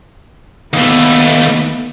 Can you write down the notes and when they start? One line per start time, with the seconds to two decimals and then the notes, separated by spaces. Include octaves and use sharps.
0.73 D#2 A3 B3